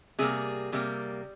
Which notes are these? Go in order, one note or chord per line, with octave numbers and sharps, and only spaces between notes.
C3 G3 A#3 G#4
C3 G3 A#3